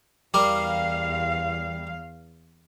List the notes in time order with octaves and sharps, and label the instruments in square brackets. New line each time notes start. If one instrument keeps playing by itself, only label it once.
[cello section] E2 F5 [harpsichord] G3 A#4 [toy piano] D6